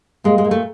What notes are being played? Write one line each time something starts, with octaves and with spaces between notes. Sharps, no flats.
A#2 G#3
G#3
A#2
A3